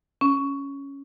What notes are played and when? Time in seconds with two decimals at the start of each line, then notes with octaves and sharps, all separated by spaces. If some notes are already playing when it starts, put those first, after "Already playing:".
0.21 C#4